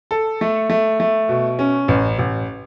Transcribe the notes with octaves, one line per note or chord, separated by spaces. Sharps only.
A4
A3
A3
A3
B2
C#4
A1
A1